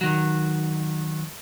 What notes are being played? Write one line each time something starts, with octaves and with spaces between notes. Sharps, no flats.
D#3 F#3